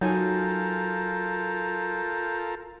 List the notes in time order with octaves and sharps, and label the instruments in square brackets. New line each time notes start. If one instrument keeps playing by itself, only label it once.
[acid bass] F#3 [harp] D#4 G#5 [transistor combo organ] F4 A4 A#4 [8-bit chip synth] G6